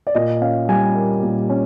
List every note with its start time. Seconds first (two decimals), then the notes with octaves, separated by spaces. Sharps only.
0.07 D5
0.15 A#2 D#5
0.41 C#4 F5
0.69 G3 G#5
0.95 A#3
1.23 A#2
1.50 C#4